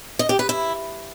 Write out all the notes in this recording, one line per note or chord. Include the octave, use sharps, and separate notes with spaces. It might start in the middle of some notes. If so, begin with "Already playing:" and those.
D#5
G4
B4
E4